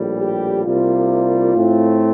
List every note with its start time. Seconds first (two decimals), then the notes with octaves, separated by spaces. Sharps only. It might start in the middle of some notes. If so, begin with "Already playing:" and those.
Already playing: A#1 A2 G3
0.18 G4
0.64 C2 C3 G3 A#3 F4
1.56 A2 A3 C4